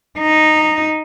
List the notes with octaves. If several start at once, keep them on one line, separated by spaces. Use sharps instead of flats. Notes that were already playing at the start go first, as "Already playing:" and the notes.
D#4